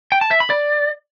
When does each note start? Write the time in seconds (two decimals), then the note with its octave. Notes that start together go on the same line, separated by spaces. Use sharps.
0.12 G5
0.21 A5
0.31 E5
0.40 B5
0.50 D5